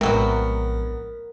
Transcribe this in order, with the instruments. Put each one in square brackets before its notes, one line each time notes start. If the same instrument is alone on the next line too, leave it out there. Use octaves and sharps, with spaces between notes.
[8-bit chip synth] A#1 [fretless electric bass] A2 G#3 [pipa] C3 F#3 B3 [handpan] A#4